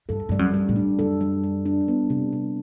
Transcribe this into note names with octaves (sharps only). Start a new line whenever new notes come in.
G2 A4
G2 G3
F#2
G3
A2
D4
F#2 A4
G3
G3
D4
B3
C3
C3